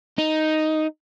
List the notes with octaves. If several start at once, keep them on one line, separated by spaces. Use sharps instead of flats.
D#4